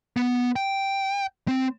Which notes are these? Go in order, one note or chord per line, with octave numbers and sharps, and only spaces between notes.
B3
G5
C4